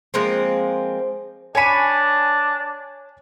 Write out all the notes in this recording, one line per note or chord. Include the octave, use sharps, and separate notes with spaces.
F3 G#3 A#3 C4
D4 C#5 G#5 B5 C#7 D#7